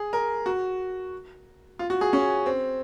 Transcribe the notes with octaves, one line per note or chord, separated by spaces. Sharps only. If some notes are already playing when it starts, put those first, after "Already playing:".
Already playing: G#4
A#4
F#4
F4
F#4
G#4
C#4
C4